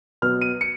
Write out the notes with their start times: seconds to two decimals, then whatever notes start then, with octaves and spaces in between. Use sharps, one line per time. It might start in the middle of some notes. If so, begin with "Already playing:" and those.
0.22 B2 F#3 B3 F6
0.41 D#7
0.61 C#7